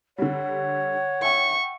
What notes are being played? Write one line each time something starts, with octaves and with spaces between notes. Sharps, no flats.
D3 G3 C#5 F#5
E5 G5 C#6